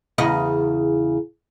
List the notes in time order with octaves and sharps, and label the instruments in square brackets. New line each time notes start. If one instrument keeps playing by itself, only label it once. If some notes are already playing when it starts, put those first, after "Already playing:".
[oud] E2 C#3 D#5